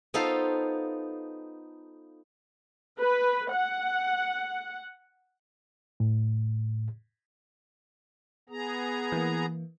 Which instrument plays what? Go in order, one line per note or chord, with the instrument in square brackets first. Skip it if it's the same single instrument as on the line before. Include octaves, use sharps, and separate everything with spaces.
[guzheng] B3 D#4 F4 A4 C5 F5
[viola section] B4
F#5
[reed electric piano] A2
[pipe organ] B3 G#4 A#5
[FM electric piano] E3 A#3